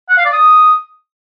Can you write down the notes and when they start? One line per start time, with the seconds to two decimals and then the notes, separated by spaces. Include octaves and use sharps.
0.09 F#5
0.17 F5
0.25 D5
0.33 D#6